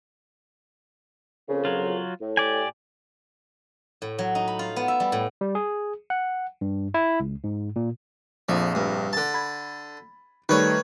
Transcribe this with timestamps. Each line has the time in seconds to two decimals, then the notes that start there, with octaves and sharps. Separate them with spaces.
1.48 F2 A#2 C#3
1.65 F#3 F4
2.21 A2
2.37 G4 D5 G#5
4.02 A2
4.19 F#3
4.35 D#4
4.48 B5
4.59 F4
4.76 B3
4.88 E5
5.00 G3
5.12 A2
5.41 G3
5.55 G#4
6.10 F#5
6.61 G2
6.94 E4
7.20 C#2
7.44 G#2
7.76 A#2
8.49 A#1 F2 F3
8.75 G2
9.13 D3 A5
9.34 B5 G#6
10.49 D#3 G3 A3 B4 C#5